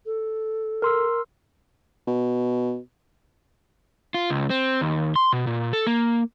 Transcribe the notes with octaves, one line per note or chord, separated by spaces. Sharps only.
A4
A#4 C6 E6
B2
F4
C#2
C4
D#2
C6
B2
A#2
A4
A#3